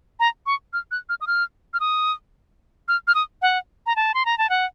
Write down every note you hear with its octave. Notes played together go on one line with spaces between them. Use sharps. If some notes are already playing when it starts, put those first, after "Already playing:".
A#5
C#6
F6
F#6
F6
D#6
F6
F6
D#6
F6
F6
D#6
F#5
A#5
A5
C6
A#5
A5
F#5